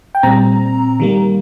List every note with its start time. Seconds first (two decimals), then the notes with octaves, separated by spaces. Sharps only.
0.15 G5
0.23 A#2 G3 C4 A#5
1.00 D#3 G3 A#3